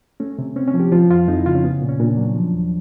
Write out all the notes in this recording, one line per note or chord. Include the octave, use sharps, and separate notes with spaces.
A3 C#4
C3
C4 C#4
C#4
F3
G4
F3 F4
F2 F4
F2 D#4
E4
C#3 F4
C#4
B3
A#2
C#4
A#2 D4
F#3
F3
D#2